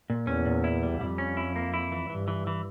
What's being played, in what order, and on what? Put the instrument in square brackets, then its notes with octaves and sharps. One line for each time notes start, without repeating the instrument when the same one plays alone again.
[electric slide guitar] A#2
[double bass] E2 [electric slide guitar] C#4
[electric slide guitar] A#2
E4
G3
[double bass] F2 [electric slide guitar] G3
[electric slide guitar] C#4
E4
A#3
E4
E3
[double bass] G2 [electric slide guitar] E3
[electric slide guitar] E3
E3